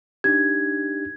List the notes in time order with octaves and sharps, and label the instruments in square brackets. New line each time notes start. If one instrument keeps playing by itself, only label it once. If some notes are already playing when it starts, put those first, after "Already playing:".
[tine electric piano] D4 D#4 G4 [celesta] G#6